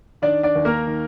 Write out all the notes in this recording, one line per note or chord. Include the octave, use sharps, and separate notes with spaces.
D#3 D4 D5
D4 D5
D#2
A#3 A#4
D#3